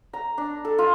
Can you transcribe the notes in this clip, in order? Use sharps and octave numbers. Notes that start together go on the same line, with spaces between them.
A#5
D4
A4
F4